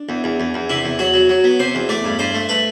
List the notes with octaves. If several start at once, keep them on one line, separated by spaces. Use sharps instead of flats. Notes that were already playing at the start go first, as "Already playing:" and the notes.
Already playing: D4
E2
E2
E2
E2
C3 E4
E2
F#3 F#4
F#3
F#3
B3
C3 C5
E2
A3 D5
G2
G2 C5
A3
A3 B4